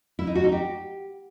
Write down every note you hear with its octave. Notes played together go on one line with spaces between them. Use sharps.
E4
D#4
F#4
D#4
G4